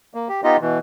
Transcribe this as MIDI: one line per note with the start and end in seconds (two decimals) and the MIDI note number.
0.14 0.28 58
0.29 0.41 67
0.44 0.57 59
0.44 0.57 63
0.44 0.57 65
0.44 0.57 67
0.44 0.57 75
0.61 0.79 47
0.61 0.79 52